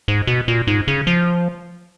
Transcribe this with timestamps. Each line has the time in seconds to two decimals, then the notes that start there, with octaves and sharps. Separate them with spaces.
0.08 G#2
0.27 B2
0.48 A#2
0.67 G#2
0.88 C#3
1.07 F3